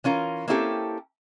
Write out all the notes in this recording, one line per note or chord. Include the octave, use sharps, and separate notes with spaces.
E3 C#4 F4 A#4
A#3 C4 C#4 E4 G4 A4